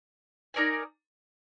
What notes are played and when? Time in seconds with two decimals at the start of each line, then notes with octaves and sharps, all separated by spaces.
0.54 D#4 A#4 D5 G#5